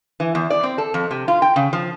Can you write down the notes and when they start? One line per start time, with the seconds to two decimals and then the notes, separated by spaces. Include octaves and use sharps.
0.20 E3
0.35 E2
0.50 D5
0.63 C4
0.78 A4
0.94 F2
1.11 C3
1.28 F4
1.42 G5
1.56 C#3
1.73 F3